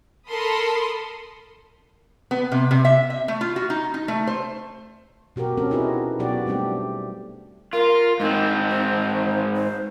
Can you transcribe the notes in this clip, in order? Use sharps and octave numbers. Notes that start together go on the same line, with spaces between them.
A4 A#4 B5 C6 D#6
B3
C3
C3
E5
E5
A3
F4
F#4
D#4
D#4
A3
C5
B2 F#4 G4 A#4
C4 C#4 A4 A#4
C4 D#4 E4 F#4 G#4 B4
B2 F#3 B3 F#4 G4 D5
G3 A3 C4 D4 G4
F4 A#4
G#2 C4 D#4
C5
C5